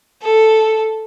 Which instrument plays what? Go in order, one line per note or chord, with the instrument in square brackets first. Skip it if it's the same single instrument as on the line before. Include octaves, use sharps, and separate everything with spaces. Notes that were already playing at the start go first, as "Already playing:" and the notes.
[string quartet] A4